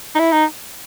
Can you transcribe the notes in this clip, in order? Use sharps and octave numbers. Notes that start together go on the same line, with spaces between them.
D#4
E4
D#4